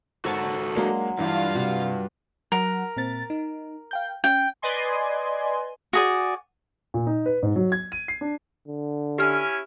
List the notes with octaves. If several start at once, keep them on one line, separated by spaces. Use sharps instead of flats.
G#1 F#4 A4 A#4 C#5 F#5 A5
F#3 G#3 A#3 D4 C6
G2 E3 F4 F5
C3 F#4
F#3 A#4 F#5
A#2 C4 A6
D#4
F5 G5 G6
C#4 G5
B4 D5 D#5 G#5 C6
F#4 G#4 D5
A#2
D#4
B4
G#2
F#3
G#6
D#7
C7
D4
D3
C#4 E4 G4 G#5 F6